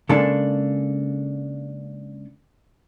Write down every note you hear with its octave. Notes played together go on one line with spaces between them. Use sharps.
C#3 G#3 A#3 D4 A4